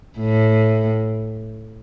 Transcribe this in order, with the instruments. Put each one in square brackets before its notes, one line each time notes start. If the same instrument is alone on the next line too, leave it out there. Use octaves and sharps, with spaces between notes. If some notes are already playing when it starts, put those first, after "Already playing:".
[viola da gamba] A2